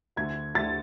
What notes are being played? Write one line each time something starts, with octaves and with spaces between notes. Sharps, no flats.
D2 D3 A3 G#6
D2 D3 A3 A6